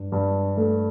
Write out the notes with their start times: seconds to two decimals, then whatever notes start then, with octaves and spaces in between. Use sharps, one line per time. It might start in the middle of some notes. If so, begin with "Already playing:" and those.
Already playing: G2
0.12 G2
0.57 A3